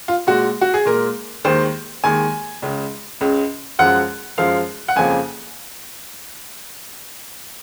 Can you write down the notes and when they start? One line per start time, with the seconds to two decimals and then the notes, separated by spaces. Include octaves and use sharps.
0.08 F4
0.27 A#2 G#3 F#4
0.61 F#4
0.74 G#4
0.86 A#2 G#3 A#4
1.45 D#2 D#3 G#3 C5
2.04 D#2 D#3 G#3 G#5
2.62 C#2 C#3 G#3
3.21 C#2 C#3 G#3
3.79 F#2 F3 G#3 F#5
4.38 F#2 F3 G#3 F5
4.88 F#5
4.96 F2 C#3 F3 A#3 G#5